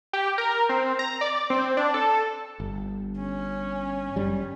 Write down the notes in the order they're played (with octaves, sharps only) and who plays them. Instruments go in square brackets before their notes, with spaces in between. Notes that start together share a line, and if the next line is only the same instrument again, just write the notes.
[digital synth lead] G4
A#4
C4
A#5
D5
C4
D4
A4
[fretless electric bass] G1
[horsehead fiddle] C#4
[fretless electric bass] G1 F#2 G3